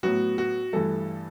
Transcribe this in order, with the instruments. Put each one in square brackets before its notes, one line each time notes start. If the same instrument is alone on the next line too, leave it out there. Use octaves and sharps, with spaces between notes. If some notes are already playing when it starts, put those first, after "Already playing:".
[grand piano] A2 F#3 B3 F#4
F#4
G2 E3 A3 A4